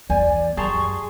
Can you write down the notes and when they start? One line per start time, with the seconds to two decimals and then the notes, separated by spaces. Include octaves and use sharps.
0.10 E2 C5 D5 G#5
0.57 F#2 G4 G#4 A5 A#5 C6 C#6